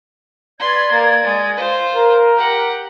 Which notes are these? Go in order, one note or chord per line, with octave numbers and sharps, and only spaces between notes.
B4 D5 C6 G#6
A#3 A#4
G#3
F4 C5
A#4
G4 F#5